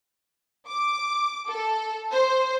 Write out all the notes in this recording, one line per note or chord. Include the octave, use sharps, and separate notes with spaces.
D6
A4
C5